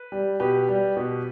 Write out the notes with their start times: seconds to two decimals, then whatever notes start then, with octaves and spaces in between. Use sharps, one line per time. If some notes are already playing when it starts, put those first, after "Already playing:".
Already playing: B4
0.12 G3
0.40 B2 G4 B4
0.69 G3
0.97 B2